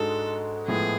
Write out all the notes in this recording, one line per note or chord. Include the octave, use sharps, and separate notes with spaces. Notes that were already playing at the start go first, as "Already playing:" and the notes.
Already playing: G#2 G#3 D4 F#4 A4
A2 F3 G#3 B3 G#4